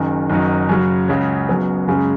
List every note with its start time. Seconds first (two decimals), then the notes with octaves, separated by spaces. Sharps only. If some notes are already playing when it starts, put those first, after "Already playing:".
Already playing: F#1 F#2 D#3
0.30 F#1 F#2 D#3 F#3 D#4
0.69 F#2 C#3 F#3
1.08 C#2 C#3 F#3 C#4
1.49 F#1 F#2 F#3 B3
1.88 F#2 C#3 G#3